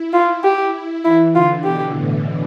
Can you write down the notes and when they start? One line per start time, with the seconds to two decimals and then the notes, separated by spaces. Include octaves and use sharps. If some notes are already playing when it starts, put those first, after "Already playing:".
Already playing: E4
0.13 F4
0.44 G4
1.05 E3 E4
1.34 D3 F4
1.64 B2 G4
1.95 A2